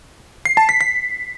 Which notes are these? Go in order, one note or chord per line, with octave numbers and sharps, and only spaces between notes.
C7
A5
B6
B6